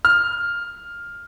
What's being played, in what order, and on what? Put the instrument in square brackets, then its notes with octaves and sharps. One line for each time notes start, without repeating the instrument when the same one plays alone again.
[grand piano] F6